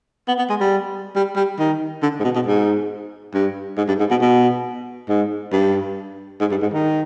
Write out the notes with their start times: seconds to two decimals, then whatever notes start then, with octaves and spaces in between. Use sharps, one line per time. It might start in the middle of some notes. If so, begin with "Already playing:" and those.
0.28 B3
0.38 B3
0.50 G#3
0.60 G3
1.16 G3
1.37 G3
1.59 D#3
2.03 D3
2.20 G#2
2.24 B2
2.35 B2
2.47 G#2
3.34 G2
3.77 G#2
3.88 G2
4.00 G#2
4.11 B2
4.21 B2
5.09 G#2
5.53 G2
6.40 G#2
6.51 G2
6.62 G#2
6.73 D#3